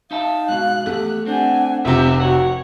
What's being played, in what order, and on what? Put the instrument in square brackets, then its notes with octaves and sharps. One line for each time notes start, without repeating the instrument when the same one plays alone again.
[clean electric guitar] D#4 E5 A5 [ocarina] F5
[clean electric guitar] G#2 B2 [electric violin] F#6
[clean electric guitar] E2 [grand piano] A3 [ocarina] G4
[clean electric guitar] C4 [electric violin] D4 G#5 [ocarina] F#5
[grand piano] F1 C3 [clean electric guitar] B3 C4 G4 [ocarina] F4 [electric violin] E5
[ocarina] F#4 [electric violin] C#5 [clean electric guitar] F#5